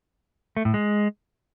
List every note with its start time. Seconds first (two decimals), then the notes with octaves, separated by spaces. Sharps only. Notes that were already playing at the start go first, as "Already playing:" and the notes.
0.57 A3
0.65 A2
0.74 G#3